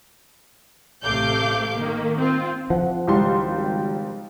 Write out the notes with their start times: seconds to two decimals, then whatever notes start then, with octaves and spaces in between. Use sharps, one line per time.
1.04 A1 C3 A3 F5 D6 G6
1.76 D#3 A#3
2.18 C4 F4
2.70 F2 F3 F#5
3.08 G#1 C#2 G3 G5 C6